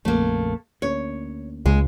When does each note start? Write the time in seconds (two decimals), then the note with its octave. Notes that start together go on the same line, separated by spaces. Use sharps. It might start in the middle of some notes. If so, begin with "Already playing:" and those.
0.05 A#1 F2 C#3 A3 A#3
0.82 D2 A#3 C#4 C#5
1.66 C#2 G#3